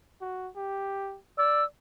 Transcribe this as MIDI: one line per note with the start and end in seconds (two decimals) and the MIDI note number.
0.21 0.49 66
0.56 1.18 67
1.38 1.66 74
1.38 1.64 88